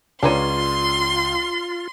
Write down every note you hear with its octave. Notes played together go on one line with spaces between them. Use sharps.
C#2 D4 F4 B4 C#5 A#5 C6 D#7